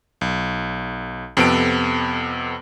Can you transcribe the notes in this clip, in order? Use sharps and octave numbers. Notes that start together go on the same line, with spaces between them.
B1
F2 C3 B3 A4 D7